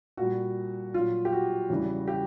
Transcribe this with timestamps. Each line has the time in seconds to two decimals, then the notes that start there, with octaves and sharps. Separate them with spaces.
0.17 A#2 G3 F#4
0.94 A#2 F#3 F4
1.25 G4
1.32 F#4
1.70 E2 C#3 E3 G3
2.08 G4